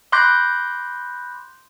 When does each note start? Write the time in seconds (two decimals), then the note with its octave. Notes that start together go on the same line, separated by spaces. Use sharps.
0.12 B5 C6 D6 F#6 G6 A#6